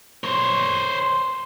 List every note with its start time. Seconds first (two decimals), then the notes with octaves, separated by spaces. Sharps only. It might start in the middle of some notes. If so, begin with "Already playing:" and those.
0.24 C5 C#5